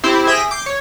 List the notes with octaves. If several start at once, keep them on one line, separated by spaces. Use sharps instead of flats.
C4 E4 G4 C5
G#4 E5 G5 A#6 B6 D#7
D6 G6 C7
C#5